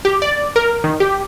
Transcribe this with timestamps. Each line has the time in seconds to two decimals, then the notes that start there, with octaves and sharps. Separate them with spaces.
0.05 G4
0.22 D5
0.56 A#4
0.84 D#3
1.00 G4